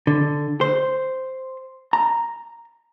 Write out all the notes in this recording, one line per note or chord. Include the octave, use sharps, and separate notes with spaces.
D3
C5
A#5